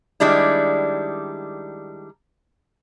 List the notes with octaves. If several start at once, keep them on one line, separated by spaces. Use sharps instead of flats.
D#3 G3 G#3 D4 E4